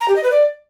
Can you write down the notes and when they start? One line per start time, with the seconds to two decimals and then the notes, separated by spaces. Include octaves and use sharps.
0.01 A#5
0.08 G4
0.16 D#5
0.23 B4
0.31 D5